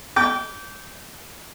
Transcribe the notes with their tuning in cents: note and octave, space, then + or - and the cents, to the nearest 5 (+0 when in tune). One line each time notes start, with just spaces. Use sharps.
G5 -15 D6 -30